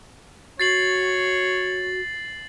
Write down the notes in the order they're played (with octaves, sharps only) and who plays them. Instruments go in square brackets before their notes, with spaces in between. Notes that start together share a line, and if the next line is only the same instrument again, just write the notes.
[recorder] F#4 [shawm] C#5 [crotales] A6 C7 F#7